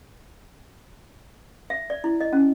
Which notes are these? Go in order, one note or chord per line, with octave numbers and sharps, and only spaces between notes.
E5
D5
E4
D#5
C#4